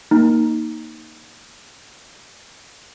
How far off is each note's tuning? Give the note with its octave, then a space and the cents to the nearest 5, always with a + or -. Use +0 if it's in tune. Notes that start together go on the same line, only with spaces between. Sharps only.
A#3 +0 D#4 +0